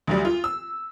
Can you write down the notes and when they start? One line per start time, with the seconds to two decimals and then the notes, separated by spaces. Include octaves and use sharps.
0.07 D2 F#3 G3
0.25 F4
0.44 E6